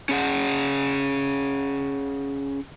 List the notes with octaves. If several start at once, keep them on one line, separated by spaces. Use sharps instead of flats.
C#4 G#4 F#5